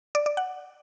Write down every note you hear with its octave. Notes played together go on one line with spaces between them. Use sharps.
D5
D5
F#5